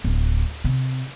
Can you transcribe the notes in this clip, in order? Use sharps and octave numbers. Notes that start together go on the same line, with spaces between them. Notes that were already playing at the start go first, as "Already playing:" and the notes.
D1
C3